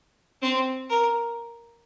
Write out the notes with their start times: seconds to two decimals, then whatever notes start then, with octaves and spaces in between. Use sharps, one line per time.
0.42 C4
0.90 A#4